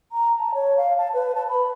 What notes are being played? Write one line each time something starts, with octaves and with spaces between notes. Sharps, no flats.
A#5
A5
C#5
F5
A5
B4
A5
B5